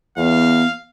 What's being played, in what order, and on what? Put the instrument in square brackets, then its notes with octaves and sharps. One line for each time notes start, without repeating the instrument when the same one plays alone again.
[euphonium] E2 [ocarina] B3 [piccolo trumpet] F5